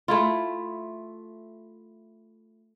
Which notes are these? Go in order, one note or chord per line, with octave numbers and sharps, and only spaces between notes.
A3 E4 F4